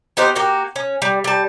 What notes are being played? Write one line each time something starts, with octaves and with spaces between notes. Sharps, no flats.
B3 D#4 G4 C5
A#3 F#4 G4
C#4
G3
G3 A5